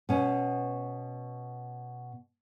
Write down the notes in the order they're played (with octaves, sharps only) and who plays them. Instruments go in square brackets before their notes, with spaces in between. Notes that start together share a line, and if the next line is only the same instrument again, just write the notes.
[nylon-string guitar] B2 C#4